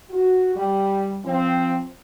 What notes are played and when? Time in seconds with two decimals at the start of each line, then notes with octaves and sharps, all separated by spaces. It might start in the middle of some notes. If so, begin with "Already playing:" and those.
0.10 F#4
0.56 G3
1.24 F3 C4